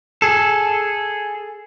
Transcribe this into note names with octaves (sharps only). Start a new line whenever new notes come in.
G#4 A4